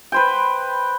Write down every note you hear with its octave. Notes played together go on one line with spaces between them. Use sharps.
B4 C5 G5